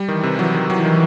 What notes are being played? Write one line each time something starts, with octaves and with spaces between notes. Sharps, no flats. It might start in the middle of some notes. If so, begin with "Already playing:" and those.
Already playing: G3
D#3 E3
C3
F#3
D#3
E3 F#3
D#3